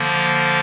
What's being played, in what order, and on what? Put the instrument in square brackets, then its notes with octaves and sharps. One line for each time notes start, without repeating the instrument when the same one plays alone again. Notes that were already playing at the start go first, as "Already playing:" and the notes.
Already playing: [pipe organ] D3 F3 A#3